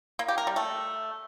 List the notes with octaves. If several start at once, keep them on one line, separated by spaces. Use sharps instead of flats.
A#3
G4
A#4
G3
A3